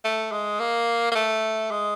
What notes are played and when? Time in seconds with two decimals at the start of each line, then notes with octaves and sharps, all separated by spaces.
0.04 A3
0.32 G#3
0.60 A#3
1.12 A#3
1.15 A3
1.71 G#3